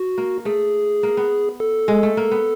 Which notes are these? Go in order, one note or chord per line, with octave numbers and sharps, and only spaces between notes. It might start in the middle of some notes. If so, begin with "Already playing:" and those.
Already playing: F#4
A#3
A3 G#4
A#3
B3
A4
G#3
A3
A#3
B3